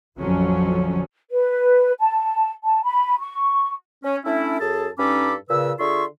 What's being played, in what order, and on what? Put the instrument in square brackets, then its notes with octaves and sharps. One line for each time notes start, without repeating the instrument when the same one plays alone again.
[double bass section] A1 F2 D3 F3 F#3 C#4
[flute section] B4
A5
A5
B5
C#6
[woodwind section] C#4
A3 C#4 D4 E4
F#2 G#4 A4 A5
G2 C#4 D#4 A4 B5 D6
A#2 C#3 B4 E6
D3 F4 G#4 E5 C6 C#6